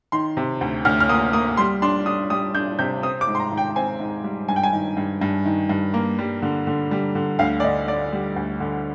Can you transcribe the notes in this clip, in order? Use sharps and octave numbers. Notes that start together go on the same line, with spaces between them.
D#3 C6
C3
D2
D2 F6
F6
A#3 D#6
A#3 D#6
G3 C6
D4 C6
D4 D#6
G3 D#6
D4 G6
C3 G6
C4 D#6
D6
G#2
C6
A#5
D#3
G5
C4 G#5
G#2
G3
G2 G#5
G5
G#5
D#3
G2
G2
D#3
G2
A#3
G3
D3
D3
G3
D3
D2 F5
D5
D3 D#5
D3 D5
G3
D2
D3